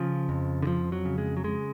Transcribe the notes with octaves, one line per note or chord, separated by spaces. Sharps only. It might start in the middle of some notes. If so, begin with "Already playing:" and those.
Already playing: C#3 F3
F2
D3
F2 F3
F#3
C#3
G#3
F#3
C#3 G#3